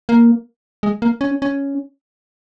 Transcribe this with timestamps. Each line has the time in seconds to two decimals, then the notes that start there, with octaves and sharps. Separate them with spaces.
0.09 A#3
0.83 G#3
1.02 A#3
1.21 C#4
1.42 C#4